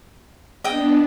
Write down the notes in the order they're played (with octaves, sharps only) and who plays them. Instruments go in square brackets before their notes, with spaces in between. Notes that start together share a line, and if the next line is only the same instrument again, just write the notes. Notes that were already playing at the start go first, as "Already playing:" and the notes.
[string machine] B3 D4 [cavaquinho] D#5 G5